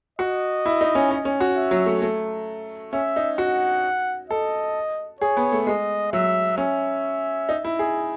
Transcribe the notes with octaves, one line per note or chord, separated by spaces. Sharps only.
F#4 D#5
E4
D#4
C#4
C#4
C#4
F#4
E5
F#3
A3
A3
C#4 E5
D#4
F#4 F#5
A4 D#5
G#4 C#5
B3
A3
G#3 D#5
F#3 E5
C#4 E5
D#4
E4
G#4